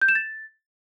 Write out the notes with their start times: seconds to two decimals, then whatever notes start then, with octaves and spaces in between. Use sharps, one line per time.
0.02 G6
0.08 E7
0.15 A6